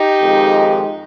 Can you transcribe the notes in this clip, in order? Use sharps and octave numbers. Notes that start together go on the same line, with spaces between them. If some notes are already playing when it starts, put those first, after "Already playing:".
Already playing: D#4 G4
F2 D#3 G#3